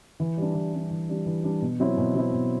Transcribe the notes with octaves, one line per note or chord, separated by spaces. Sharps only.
E3
G3 D4
E3
G3 D4
E3
G3 D4
E3
G3 D4
B2
F#3 C4 E4
B2
F#3 C4 E4
B2